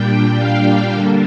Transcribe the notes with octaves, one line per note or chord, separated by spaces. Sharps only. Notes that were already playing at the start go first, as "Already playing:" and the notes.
Already playing: A#2 G3 D4 G5
F5
D3 G3 A#3 D4